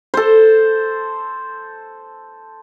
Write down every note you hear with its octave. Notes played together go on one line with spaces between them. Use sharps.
A4 C5